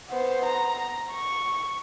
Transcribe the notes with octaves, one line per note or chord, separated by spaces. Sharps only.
B3 C5
A#5
C#6